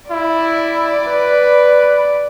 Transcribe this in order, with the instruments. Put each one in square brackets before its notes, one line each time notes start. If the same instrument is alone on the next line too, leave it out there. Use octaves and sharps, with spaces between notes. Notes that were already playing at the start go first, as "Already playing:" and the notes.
[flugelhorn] E4 [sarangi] D5
[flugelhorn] B4